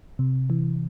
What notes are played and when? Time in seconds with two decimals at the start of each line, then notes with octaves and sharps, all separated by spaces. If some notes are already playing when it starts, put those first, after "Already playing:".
0.19 C3
0.50 E3